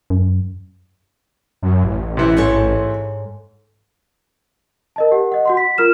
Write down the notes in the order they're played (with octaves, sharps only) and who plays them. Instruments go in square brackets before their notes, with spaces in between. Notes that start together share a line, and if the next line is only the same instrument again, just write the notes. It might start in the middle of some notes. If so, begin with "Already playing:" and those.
[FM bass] F#2
[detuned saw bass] F#2
A1
[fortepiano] C3 E3
[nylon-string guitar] G#2 A4 C#5
[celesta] A#4 D#5 A5
G4 F#5
D#5 F#5
F#4 F#5 C6
B6
F4 A#4 F6 E7